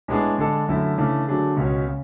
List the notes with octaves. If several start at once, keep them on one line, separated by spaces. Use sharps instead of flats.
A2 G#3 B3 D4 G#4
D3 G#3 D4 A4
F#2 D3 A3 E4
C#3 E3 A3 D4
D3 F#3 A3 D4 G#4
C#2 B2 G#3 C#4
C#3